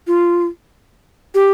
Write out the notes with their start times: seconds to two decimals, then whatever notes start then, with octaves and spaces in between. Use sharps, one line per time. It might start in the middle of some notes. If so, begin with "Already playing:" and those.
0.07 F4
1.35 G4